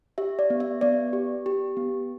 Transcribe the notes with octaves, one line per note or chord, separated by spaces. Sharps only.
G4 E5
D5
B3
E5
B3 D5
G4
G4
B3